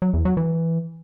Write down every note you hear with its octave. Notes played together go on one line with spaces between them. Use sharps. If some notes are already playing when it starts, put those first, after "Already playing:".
F#3
E2
F#3
E3